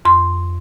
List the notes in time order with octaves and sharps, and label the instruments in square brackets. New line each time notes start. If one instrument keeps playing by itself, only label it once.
[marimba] F2 C6